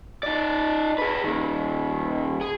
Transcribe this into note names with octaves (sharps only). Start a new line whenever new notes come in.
D#4 D5
G#4 B4
A#2 D#3
G#4